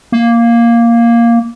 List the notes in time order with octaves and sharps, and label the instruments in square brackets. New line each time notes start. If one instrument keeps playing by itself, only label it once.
[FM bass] A#3